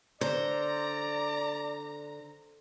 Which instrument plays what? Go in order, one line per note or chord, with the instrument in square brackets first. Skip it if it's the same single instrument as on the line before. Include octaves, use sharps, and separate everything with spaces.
[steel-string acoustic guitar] D3 [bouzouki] C5 [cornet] D5 [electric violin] A#5